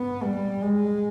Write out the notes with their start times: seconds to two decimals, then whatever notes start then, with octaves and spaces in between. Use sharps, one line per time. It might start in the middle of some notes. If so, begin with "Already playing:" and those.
Already playing: B3
0.23 G3
0.62 G#3